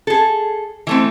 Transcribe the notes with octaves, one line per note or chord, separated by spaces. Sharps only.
G#4 A4
E3 A3 C4